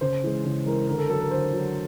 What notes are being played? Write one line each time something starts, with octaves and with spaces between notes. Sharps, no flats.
C#3 C5
E3 G#3
C#3
E3 G#3 A#4
D3 A#4
A4
F#3 A4
A#4
D3 C5
F#3